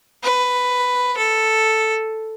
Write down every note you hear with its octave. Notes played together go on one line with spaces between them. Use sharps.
B4
A4